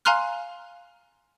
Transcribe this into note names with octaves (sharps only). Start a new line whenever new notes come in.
F5 G#5 A#5 C6 F6 F#6